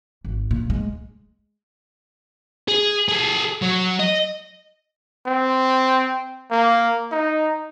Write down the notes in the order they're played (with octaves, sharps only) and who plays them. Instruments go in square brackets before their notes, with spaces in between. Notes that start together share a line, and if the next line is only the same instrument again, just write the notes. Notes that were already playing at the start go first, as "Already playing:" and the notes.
[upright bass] G#1
A#2
G#3
[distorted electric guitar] G#4
G#4 A4
F#3
D#5
[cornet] C4
A#3
D#4